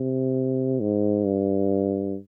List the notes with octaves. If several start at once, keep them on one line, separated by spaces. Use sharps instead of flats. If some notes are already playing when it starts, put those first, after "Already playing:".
Already playing: C3
G#2
G2